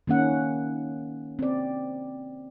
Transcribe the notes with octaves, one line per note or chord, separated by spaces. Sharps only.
D#3 A#3 C#4 F#5
C4 D5